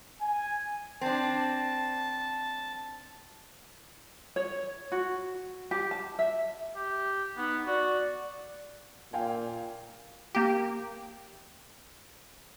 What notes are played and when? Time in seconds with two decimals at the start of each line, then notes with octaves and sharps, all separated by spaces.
0.21 G#5
1.01 C4 D4 A5
4.36 C#5
4.92 F#4
5.71 G4
5.91 A5
6.19 E5
6.76 G4
7.37 B3 D#4
7.67 F#4 D5
9.13 A#2 F5 G5 G#5
10.35 A#3 G4